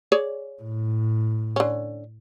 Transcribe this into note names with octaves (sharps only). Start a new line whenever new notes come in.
G#4 C#5 D5
A2
D3 C#4